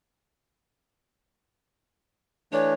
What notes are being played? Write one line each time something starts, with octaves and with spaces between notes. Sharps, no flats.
E3 A3 D4 C#5